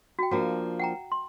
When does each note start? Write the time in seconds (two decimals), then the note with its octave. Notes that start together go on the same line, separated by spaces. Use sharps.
0.19 F#4 G5
0.31 F3 A#3 D4 F#4
0.79 F#5 G5 A#5
1.12 C6